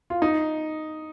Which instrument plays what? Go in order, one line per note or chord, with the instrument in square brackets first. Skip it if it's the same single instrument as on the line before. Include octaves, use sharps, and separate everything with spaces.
[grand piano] F4
D#4